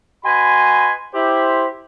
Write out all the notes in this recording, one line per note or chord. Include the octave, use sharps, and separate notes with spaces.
F#4 B4 D#5 G#5 B5 C6
E4 G4 C5